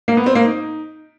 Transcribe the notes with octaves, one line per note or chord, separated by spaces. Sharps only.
A#3
B3
C4
A#3
D#4